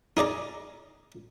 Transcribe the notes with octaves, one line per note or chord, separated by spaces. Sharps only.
D#4 G#4 D5 A#5